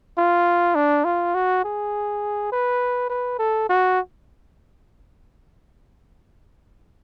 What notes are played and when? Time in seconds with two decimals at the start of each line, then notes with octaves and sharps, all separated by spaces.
0.18 F4
0.75 D4
1.05 F4
1.34 F#4
1.64 G#4
2.52 B4
3.10 B4
3.39 A4
3.69 F#4